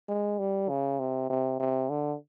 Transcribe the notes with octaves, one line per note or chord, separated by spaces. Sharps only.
G#3
G3
C#3
C3
C3
C3
D3